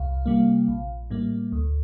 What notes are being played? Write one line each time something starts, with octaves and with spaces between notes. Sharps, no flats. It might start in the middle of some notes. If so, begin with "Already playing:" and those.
Already playing: C2 F5
C3 G3 A#3
A#1
A2 G3 A#3
D2